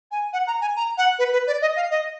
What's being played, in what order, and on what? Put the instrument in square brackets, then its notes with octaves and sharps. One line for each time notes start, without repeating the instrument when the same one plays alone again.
[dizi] G#5
F#5
A#5
G#5
A#5
F#5
B4
B4
D5
D#5
F5
D#5